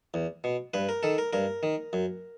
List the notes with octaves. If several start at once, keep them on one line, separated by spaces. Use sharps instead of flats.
E2
B2
G2 B4
A#4
D#3 A4
A#4
G2 A#4
D#3
F#2